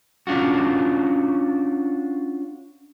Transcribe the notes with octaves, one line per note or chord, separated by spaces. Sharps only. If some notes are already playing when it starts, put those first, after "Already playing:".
C#4 D4 F4 F#4